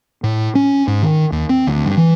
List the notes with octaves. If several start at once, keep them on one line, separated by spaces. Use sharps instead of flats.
A2
C#4
G#2
D#3
D#2
C4
D2
G2
E3